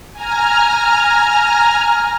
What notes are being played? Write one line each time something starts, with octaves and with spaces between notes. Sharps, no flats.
G#5 A#5 F6